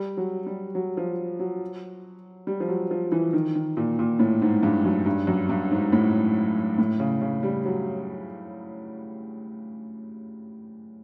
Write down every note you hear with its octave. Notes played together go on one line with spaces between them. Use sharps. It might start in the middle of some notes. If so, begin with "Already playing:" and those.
Already playing: G3
F#3
G3
F#3
F3
F#3
G3
F3
F#3
F3
E3
D#3
D#3
A#2
A#2
A2
G#2
G2
F#2
G2
F#2
G2
G#2
A2
A2
C#3
C#3
G3
F#3